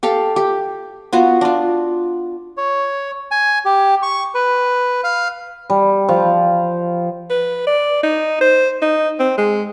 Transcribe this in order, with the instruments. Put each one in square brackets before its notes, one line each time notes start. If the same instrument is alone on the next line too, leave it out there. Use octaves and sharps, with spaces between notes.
[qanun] G4 A4 F5
G4
B3 F4 F#4
D4 F4
[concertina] C#5
G#5
G4
C#6
B4
F5
[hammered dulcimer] G3
F3
[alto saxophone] B4
D5
D#4
C5
D#4
C4
G#3